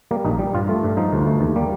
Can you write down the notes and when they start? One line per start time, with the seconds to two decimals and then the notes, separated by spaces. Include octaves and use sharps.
0.11 G3 A#3
0.25 A#1 D#4
0.39 G3
0.53 G2 F4
0.69 A3
0.83 G2
0.97 F3 D#4
1.12 D2
1.26 A3
1.41 D#2
1.56 G3 A#3